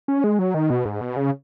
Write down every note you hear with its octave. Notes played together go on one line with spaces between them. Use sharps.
C#4
G#3
F#3
D#3
B2
G#2
B2
C#3